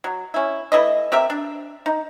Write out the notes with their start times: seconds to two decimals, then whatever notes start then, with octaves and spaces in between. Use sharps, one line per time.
0.04 F#3
0.34 C#4 E4
0.72 A3 E4 B4 D#5
1.12 C4 G4 A#4 E5
1.30 D4
1.86 D#4